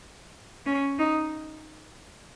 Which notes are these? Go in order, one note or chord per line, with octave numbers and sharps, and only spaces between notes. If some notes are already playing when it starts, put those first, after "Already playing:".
C#4
D#4